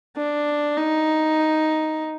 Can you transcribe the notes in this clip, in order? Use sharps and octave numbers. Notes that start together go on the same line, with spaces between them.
D4
D#4